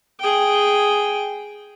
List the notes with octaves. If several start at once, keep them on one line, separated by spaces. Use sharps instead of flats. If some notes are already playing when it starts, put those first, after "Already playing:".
G#4 G5